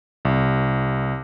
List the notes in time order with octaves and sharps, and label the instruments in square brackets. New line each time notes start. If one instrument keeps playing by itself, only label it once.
[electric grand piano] C2